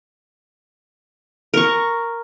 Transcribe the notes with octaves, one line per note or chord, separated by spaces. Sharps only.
A#4 C#6